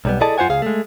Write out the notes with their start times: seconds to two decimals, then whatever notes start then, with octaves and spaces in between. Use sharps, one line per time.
0.05 B1 G3 B3
0.21 E4 G#4 A4 D5 D#5 A5
0.38 F#2 F4 C5 C#5 F#5 G#5
0.49 C#2 G#4 F5
0.62 G#3 A3